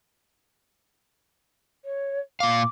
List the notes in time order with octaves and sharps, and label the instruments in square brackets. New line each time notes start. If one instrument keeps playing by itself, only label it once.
[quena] C#5
[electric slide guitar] A#2 F5 [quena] D6